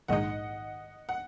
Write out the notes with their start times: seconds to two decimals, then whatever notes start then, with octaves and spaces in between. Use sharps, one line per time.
0.08 A#1 G#2 D#3 G#3 D#4 D#5 F#5
1.09 F#5